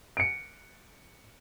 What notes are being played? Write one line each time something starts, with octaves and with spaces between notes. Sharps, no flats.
C#7 D7